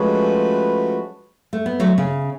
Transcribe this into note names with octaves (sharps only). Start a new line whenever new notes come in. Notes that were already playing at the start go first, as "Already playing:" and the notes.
Already playing: F3 G#3 A3 C#4 F#4 B4
A3
B3
F#3 A3
C#3